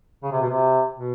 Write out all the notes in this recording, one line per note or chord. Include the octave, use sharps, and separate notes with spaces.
C#3
C3
B2
C3
B2